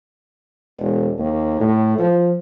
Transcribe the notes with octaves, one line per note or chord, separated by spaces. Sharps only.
E1
D#2
A2
F3